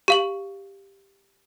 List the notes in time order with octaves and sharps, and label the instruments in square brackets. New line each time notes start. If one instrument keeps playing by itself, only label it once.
[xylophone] G4 F5 F#7